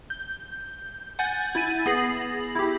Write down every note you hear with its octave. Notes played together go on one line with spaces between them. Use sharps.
G6
F#5 G#5 G6 A6
E4 B5 A6 D#7
B3 G#4 A#6 C7 F#7
E4 G4